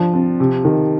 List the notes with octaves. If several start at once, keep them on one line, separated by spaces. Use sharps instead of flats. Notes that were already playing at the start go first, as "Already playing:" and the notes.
Already playing: F3 D4
C4
C3
D#3